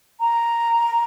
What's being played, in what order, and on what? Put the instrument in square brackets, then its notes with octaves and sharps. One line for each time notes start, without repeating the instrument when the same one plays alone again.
[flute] A#5